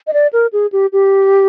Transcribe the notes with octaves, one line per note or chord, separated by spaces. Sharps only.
D#5
D5
A#4
G#4
G4
G4